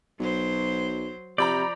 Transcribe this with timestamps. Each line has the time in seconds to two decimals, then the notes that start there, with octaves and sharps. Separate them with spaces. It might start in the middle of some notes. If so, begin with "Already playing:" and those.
0.19 B1 F#3 C5
1.38 C3 F3 D5 A#5 B5 G6